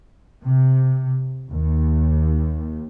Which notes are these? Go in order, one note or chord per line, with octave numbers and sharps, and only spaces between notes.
C3
D#2